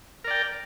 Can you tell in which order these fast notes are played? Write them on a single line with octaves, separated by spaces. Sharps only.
A#4 D5 G5